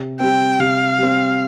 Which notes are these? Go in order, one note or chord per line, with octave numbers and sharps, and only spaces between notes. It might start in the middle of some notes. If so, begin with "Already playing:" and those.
Already playing: C3
G3 C4 G5
C3 F5
G3 C4